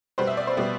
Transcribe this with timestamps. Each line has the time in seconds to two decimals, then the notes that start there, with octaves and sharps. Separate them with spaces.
0.18 B2 G3 B3 C5
0.27 E5
0.37 D5
0.47 C5
0.57 B2 G3 B3